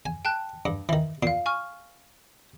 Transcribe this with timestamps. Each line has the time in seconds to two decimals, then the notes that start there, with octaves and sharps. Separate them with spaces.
0.06 G#5
0.25 G5 A5 F#6
0.65 G2
0.89 D#3 E3
1.23 A#2 F5 C7
1.46 G#5 C#6 F6